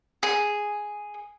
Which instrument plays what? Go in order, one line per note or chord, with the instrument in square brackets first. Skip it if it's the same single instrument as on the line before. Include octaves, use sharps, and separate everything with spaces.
[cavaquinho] G#4